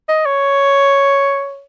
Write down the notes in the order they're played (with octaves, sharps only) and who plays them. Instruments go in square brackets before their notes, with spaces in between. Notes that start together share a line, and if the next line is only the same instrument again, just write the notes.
[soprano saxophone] D#5
C#5